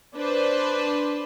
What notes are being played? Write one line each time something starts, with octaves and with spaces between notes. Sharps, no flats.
D4 B4 C5